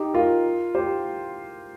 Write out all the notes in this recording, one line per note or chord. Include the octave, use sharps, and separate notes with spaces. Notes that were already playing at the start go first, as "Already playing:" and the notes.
Already playing: D#4 G4
F4 A#4
G4 C5